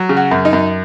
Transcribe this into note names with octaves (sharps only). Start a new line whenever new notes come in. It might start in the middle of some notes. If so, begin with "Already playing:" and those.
Already playing: F#3
C#3
F#4
F#2
D#4
F#2